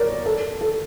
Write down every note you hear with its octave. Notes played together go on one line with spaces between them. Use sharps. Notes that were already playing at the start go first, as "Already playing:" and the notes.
Already playing: A#4 C#5 D5
A4
A4